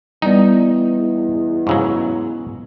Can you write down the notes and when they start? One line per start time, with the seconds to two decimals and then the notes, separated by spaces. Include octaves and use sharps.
0.22 E2 G3 B3 D#4 D5 D#5
1.67 G#2 C#3 F#3 C#6 E6